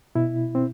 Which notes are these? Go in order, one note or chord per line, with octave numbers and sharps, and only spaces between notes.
B2 E4
C4